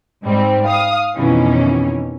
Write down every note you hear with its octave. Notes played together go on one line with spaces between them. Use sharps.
G#2 G3 C4
F5 D#6
F2 B2 D#3 E3 C#4